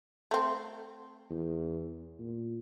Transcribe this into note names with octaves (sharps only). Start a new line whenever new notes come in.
A3 C4
E2
A#2